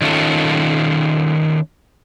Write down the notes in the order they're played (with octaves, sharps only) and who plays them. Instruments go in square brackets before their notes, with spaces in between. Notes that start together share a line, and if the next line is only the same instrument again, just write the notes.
[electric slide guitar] D#3 C#4 F4 A4